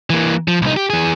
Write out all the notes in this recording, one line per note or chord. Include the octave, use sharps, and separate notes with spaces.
E3 A#3
F3
C2 D#4
G4
E3 G#4